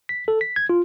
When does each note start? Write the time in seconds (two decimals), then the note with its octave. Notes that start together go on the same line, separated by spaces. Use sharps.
0.09 B6
0.28 A4
0.41 B6
0.56 G#6
0.69 F4